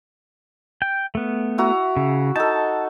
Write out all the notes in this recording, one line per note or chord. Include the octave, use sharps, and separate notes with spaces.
G5
A3 B3
E4 F#4 A#5
C#3
D#4 A4 A5